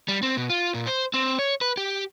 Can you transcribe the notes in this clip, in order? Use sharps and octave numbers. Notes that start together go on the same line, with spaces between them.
G3
C4
B2
F4
A#2
C5
C4
C#5
B4
G4